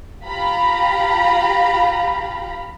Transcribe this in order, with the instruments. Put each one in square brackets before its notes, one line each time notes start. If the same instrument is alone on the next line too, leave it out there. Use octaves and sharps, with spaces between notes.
[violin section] F4 G4 F5 A#5 B5